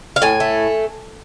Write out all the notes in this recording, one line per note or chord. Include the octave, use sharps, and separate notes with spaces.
F5
A2 G#5
A3